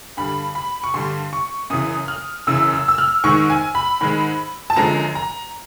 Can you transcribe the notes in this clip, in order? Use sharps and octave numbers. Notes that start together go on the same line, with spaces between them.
G2 D3 G3 B5
B5
C#6
G2 D3 G3 C6
C#6
F#2 C#3 E3 D#6
F6
F#2 C#3 E3 E6
E6
E6
F6
G#2 D#3 G#3 C#6
G#5
B5
G#2 D#3 G#3
A5
F#2 D3 F3 G#3 A#5
A#5